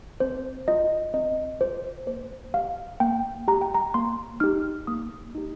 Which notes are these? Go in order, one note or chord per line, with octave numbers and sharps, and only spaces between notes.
C4 C5
F4 D#5
C4 D#5
F4 C5
A#3 C5
G4 F5
A#3 G5
G4 A#5
G5
A#5
A#3 C6
D#4 G4 F6
A#3 D#6
D#4 G4